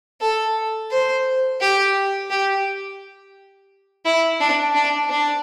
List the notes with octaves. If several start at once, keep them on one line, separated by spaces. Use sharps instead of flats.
A4
C5
G4
G4
E4
D4
D4
D4